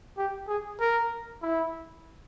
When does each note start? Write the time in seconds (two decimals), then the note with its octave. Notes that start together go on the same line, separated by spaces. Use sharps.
0.18 G4
0.48 G#4
0.80 A#4
1.43 E4